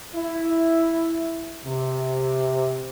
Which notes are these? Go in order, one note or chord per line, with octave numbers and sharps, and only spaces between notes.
E4
C3